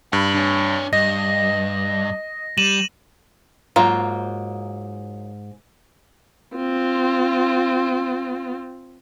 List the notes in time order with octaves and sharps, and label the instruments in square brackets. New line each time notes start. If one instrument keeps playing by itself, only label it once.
[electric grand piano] G2 [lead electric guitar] B5
[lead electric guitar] D4 C#5
[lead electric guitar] G2 [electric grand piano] D#5 [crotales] A#6
[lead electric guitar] G3 [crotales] D#7 E7 F#7
[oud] G#2 [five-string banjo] F#3 A#3 F4 [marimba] A#5
[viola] C4 F4